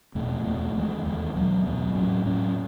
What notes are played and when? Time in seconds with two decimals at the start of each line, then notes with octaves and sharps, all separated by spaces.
0.15 E2 B2 A3
0.45 E2 B2 A3
0.75 E2 D#3 G#3
1.05 E2 D#3 G#3
1.35 E2 B2 F#3
1.65 E2 B2 F#3
1.95 A2 F#3 C#4
2.25 A2 F#3 C#4